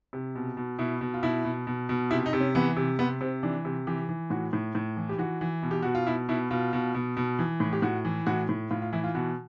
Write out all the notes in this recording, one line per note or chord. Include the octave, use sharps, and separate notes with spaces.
C3
B2
B2
B2 E4
B2
F4
B2 E4
B2
B2
B2
C3 E4
D#4
C3
C#4
E3 B3
C3
C3 B3
C3 C4
E3 D4
C3
E3 G4
E3
A2 F#4
A2
A2
E3
G4
E3 F#4
E3
B2
G4
B2 F#4
F4
B2 E4
B2 E4
B2 F4
B2
B2
B2
E3
A2
G4
A2 F#4
E3
A2 F#4
A2
A2 F4
F4
E3 E4
F4
B2 F#4